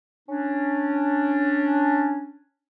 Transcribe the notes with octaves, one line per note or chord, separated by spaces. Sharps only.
C#4 D4